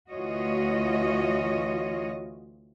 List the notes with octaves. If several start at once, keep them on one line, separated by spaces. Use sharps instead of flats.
D2 E3 F4 F#4 C#5 D#5